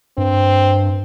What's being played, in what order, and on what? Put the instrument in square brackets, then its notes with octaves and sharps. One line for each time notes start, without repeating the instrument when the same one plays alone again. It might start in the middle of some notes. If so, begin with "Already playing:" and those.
[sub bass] G2 [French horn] C4